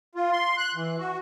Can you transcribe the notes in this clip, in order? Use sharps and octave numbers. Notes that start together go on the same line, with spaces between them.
F4
C6
F#6
E3
F#4